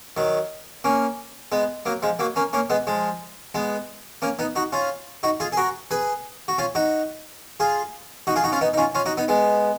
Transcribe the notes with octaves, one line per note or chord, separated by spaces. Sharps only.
D#3 F#3
A#3 C#4
G#3 B3
F#3 A#3
F3 G#3
F#3 A#3
A#3 C#4
A#3 C#4
G#3 B3
F3 G#3
G#3 B3
A#3 C#4
B3 D#4
D#4 F#4
C#4 F4
D#4 F#4
F4 G#4
G#4
F#4 A#4
G#4 B4
F#4
C#4 F4
D#4 F#4
F4 G#4
D#4 F#4
F4 G#4
D#4 F#4
C#4 F4
B3 D#4
D#4
C#4 F4
C#4 F4
D#4 F#4
B3 D#4
G#3 B3